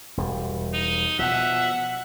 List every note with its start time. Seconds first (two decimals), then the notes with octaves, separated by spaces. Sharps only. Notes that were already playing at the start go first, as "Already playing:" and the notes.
0.17 E1 G3
0.74 D#4
1.19 B2 F3 E5 F#5